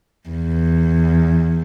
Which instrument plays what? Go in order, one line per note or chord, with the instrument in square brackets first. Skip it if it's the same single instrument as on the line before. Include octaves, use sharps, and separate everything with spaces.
[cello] E2